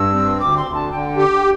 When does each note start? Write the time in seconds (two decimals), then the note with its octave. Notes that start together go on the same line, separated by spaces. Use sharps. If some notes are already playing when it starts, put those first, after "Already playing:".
Already playing: G2 E6
0.14 C4
0.40 D2 D6
0.57 C6
0.66 D2
0.74 A5
0.91 D3 G5
1.17 G4